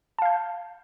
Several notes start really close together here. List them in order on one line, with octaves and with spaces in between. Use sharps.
A5 F5 G6